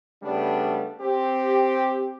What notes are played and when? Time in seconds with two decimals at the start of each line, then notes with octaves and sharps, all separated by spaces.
0.23 C#3 G3 A3 B3 D4
1.01 C4 G4